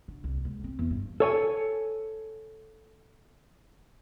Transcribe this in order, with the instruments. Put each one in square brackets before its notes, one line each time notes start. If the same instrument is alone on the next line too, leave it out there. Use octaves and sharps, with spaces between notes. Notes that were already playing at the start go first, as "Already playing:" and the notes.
[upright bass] D3
C2
C#2
C4
E2
G2
[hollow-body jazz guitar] A4 C#5 G#5